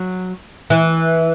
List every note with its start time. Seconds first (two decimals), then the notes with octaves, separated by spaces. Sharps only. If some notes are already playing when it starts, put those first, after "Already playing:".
Already playing: F#3
0.70 E3